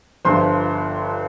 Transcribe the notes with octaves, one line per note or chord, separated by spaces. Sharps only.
G1 G2 F3 C5 C6